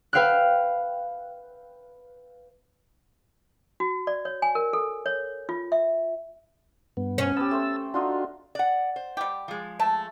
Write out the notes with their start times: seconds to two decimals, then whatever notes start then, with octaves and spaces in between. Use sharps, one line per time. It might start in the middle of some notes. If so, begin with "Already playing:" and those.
0.13 B4 E5 F5 G5 F6 F#6
3.80 F#4
4.07 D5
4.25 C#5
4.42 G#5
4.55 A#4
4.73 A4
5.06 C#5
5.49 F4
5.72 E5
6.97 G2 B3
7.18 C#4
7.36 B3 G4 A5 E6
7.51 A3 C5
7.94 D4 D#4 F4 F#4 C6
8.55 D5 F#5
8.96 C5
9.17 G3 G4
9.48 F3 G#3
9.79 A3 A5